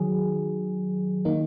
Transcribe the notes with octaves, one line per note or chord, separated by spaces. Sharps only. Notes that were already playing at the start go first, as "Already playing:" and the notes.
Already playing: D#3 F#3 G#4
D#3 A#3 D#4